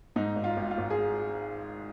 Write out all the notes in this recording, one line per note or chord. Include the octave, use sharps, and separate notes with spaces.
G#2 D#4
G#1
F4
G#1
F4
G#1
G#4